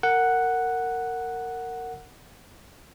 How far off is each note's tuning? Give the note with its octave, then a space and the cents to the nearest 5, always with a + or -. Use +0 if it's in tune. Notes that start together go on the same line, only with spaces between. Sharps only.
A#4 -20 F#5 +0